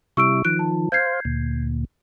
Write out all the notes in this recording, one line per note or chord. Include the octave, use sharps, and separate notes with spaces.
C3 G3 E4 C#6 E6 D7
D#3 F3 F#6 D7
A5
C5 F5 G6 G#6 C7
D2 A#2